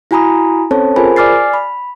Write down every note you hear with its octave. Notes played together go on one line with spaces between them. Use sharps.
E4 F#4 G#5 A#5 B5 D#6
C4 C#4 A4 C5 C#5 A5
F4 G#4 A#4 C5 G#5 B5
D5 G#5 D6 F6 A6 C7
B5